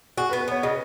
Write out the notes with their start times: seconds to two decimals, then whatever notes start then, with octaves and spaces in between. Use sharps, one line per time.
0.17 F#4 G#4
0.30 B4
0.33 B3
0.41 B4
0.48 B3 C#5
0.63 C#3 D#5